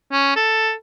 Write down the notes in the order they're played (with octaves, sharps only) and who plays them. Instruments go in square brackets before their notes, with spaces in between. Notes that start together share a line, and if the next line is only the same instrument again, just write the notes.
[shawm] C#4
A4